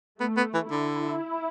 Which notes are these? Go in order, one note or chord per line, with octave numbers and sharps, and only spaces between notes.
A3 B3
B3
E3
D3 E4